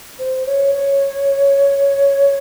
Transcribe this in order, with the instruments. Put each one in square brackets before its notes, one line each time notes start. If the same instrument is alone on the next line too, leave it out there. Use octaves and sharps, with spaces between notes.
[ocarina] C5
C#5
C#5